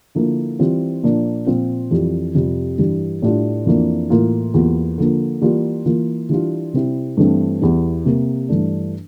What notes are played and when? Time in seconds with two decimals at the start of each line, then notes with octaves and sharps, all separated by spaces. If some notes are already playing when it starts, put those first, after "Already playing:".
0.15 D3 F3 A#3 E4
0.59 E3 G3 C4 F4
1.03 A#2 F3 A#3 D4
1.46 A#2 F3 C4 F4
1.91 F2 E3 G3
2.35 F2 C3 G3
2.78 G2 E3 G3
3.22 A2 G3 D4 F4
3.66 F2 E3 A#3 D4
4.10 A2 E3 A#3 F4
4.54 E2 E3 G3 A#3 F4
4.98 D3 F3 A#3
5.42 E3 G3 A#3 F4
5.86 E3 A#3 F4
6.29 E3 G3 D4 F4
6.73 C3 G3 C4 E4
7.17 G2 E3 A3 C4
7.61 E2 E3 G3
8.05 C3 G3 A#3
8.49 G2 E3 A3 D4